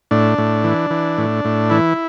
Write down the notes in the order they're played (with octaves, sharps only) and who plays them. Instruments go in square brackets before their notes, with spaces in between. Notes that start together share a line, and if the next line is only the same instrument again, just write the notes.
[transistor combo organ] A2 D4
A2
E3
E3
A2
A2
E3 E4